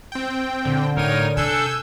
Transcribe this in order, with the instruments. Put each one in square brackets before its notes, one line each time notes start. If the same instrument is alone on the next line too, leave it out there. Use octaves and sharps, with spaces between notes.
[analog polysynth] C4 G5
[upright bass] A#2 [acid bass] D3
[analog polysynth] A2 D#7 [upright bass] A3 [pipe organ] D#4 A#4 C#5
[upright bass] C3 [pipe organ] D4 A4 [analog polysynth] G#5 E6 G6